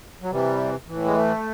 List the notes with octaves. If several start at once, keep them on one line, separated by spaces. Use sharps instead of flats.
F#3
C3 E3 G3
A2 E3
G#3
A3